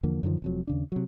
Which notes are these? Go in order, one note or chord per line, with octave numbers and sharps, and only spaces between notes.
E2 D3 F3 A#3
F#2 D3 D#3 F3
F1 F2 F#3
D#2 C#3 D4
C3 F#3